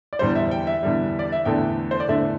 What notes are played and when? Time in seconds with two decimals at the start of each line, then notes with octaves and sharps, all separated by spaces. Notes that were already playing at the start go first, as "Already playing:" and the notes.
0.13 D5
0.19 E2 D3 G3 C5
0.35 E5
0.51 G5
0.67 E5
0.83 E2 D3 G3
1.19 D5
1.32 E5
1.45 E2 D3 A3 D4 G5
1.91 C5
2.00 D5
2.08 E2 D3 A3 D4 E5